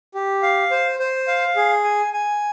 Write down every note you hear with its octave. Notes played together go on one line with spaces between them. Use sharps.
G4
F5
C5
C5
F5
G#4
G#5
G#5